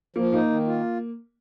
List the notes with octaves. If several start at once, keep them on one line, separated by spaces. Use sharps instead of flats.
F3 A#3
A#3 D#4
D#3
F4